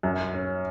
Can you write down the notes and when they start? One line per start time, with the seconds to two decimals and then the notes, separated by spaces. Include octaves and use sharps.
0.03 F#2
0.34 C#4